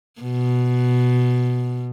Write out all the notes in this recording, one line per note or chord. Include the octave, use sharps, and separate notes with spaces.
B2